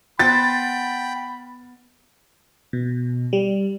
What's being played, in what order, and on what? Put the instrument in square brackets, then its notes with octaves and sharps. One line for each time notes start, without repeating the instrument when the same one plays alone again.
[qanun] B3 B4 C5 [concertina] G5 [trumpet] B5 [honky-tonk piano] A6
[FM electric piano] B2
G3